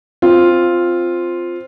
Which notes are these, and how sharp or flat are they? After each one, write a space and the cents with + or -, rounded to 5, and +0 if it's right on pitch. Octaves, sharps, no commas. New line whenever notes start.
C4 +0 F4 +0